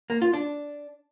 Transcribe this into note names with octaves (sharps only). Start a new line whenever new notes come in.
A#3
F4
D4